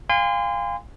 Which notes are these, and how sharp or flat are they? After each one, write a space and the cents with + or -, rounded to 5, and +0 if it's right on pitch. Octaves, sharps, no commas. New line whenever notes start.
F5 +5 G#5 -40 C6 -30